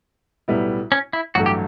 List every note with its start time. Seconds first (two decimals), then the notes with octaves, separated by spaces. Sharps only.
0.48 B1 A2 G3 B3 E4
0.92 C#4
1.13 E4
1.35 A1 G2 F#3 A3 F#4
1.46 G4